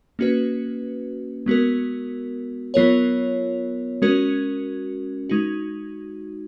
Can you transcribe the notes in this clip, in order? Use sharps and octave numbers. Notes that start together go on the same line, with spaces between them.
A#3 C#4 F#4 B4
G#3 B3 F#4 A#4
F#3 B3 F4 A#4 C#5
G#3 C#4 F#4 A#4
G#3 D#4 F#4